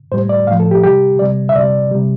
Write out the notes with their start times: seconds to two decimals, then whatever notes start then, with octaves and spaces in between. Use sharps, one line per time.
0.12 A2 G3 C5
0.29 D5
0.47 A2 F3 F5
0.60 A4
0.71 G4
0.83 C3 G3 G4
1.19 C3 G3 D5
1.49 E5
1.55 C3 G3 D5
1.91 C3 G3